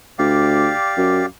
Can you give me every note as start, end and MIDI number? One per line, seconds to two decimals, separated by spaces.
0.19 0.72 38
0.19 1.26 67
0.19 1.26 74
0.19 1.26 77
0.97 1.24 42